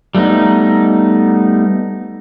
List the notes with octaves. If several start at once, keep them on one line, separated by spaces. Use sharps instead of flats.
G3 A3 B3 D#4